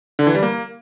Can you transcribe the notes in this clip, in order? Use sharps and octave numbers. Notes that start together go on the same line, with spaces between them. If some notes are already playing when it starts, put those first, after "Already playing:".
D3
E3
G3
A#3